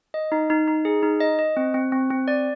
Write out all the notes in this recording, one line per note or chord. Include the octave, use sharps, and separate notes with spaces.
D#5
D#4
D#4
D#4
G#4
D#4
D#5
D#5
C4
C4
C4
C4
D5